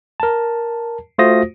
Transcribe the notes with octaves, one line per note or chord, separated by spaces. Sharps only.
A#4 A5
A3 F4 F#4 C5 D#6 A#6